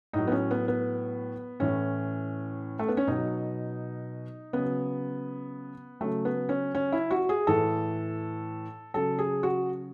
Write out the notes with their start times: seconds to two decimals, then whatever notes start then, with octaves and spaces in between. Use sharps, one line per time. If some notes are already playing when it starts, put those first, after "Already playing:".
0.13 A2 F#3 D#4
0.27 B3
0.32 C#4
0.51 B3
0.68 B3
1.60 A2 E3 C#4
2.79 A3
2.88 B3
2.97 C#4
3.07 B2 F#3 D#4
4.53 C#3 F#3 B3
6.01 C#3 F#3 A3
6.25 B3
6.49 C#4
6.75 C#4
6.92 E4
7.11 F#4
7.29 G#4
7.47 A2 E3 A4
8.94 C#3 F#3 A4
9.19 G#4
9.43 F#4